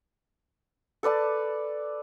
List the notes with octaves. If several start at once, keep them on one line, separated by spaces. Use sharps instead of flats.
A4 B4 D5 A5